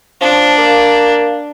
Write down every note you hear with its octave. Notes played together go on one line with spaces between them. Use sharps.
F3 D4
A#3